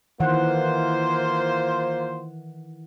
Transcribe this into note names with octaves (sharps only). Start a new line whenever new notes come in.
D#3 E3 A#3 F4 C5 F#5